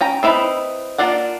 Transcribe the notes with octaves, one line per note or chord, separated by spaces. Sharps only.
C#4 G5 A#5
C4 D#4 E4 B4
A#3 D4 F4 D5 F#5